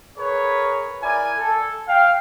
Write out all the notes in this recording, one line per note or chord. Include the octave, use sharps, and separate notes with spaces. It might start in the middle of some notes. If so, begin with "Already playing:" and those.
G#4 A#4 B4 C#5
E4 A#4 D5 G#5
A4
F5 G5